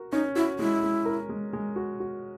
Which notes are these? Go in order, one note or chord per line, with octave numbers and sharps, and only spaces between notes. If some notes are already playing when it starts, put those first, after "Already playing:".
Already playing: F#4 A#4
C#4 D#4
E4 F#4
G#3 E4
G#3
A#4
G#3
G#3
F#4
F#4